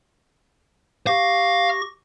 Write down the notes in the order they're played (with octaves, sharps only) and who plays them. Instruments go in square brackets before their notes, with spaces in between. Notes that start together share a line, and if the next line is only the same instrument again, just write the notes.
[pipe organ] G4 C#6 A#6 [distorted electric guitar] F5